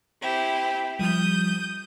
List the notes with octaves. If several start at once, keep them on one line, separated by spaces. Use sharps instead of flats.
C4 E4 G4
F3 G3 D#6 G6